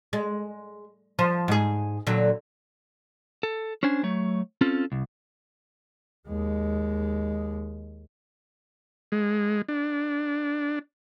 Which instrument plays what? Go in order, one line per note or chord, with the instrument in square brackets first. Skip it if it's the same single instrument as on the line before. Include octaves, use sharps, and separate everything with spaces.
[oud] G#3
F3 C5
G#2 G#4
A#2 D3 F#3
[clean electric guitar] A4
C#4 D4 C5 G#5
F#3 A3 C#5
C4 C#4 F4 A4
C2
[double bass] D#2 G#3
[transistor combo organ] G#3
D4